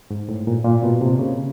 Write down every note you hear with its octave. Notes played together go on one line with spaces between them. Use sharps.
G#2
A2
A#2
A#2
B2
C3
C#3